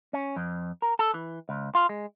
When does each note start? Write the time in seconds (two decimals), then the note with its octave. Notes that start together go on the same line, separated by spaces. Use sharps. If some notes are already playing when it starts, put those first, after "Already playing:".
0.13 C#4
0.36 F2
0.82 A#4
0.99 A4
1.14 E3
1.49 C#2
1.75 F4
1.89 G#3